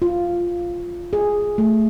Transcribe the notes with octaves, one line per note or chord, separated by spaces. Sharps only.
F4
G#4
A3